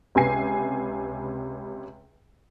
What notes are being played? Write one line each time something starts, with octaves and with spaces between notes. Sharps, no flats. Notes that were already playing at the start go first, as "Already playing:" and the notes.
C#2 C3 B4 G#5 C7